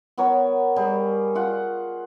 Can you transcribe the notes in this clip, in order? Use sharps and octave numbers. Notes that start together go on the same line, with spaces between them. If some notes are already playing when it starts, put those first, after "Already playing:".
B3 A#4 C#5
G3 G#4 A#4
F4 F#5